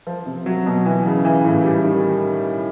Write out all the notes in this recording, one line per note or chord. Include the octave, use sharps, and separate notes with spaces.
F3
C3
F#3
B2
E3
C#3
E3
A2
G3
D#3